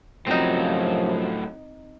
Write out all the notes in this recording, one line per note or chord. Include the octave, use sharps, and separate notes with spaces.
F#2 A2 C3 F3 F#3 C4 D#4